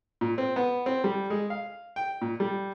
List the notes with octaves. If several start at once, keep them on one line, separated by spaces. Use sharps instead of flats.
A#2
C4
B3
C4
G3
G#3
F5
G5
A#2
G3